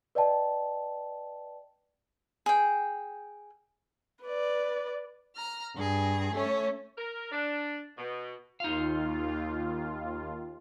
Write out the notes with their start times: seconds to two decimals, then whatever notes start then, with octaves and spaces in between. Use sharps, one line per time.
0.15 B4 D5 D#5 G5 A5
2.46 G#4 G5
4.23 B4 D5
5.35 A#5 F6
5.75 G2 G#4
6.34 A3 C#4 C#5
6.98 A#4
7.32 D4
7.98 B2
8.60 D#2 D#4 F4 F5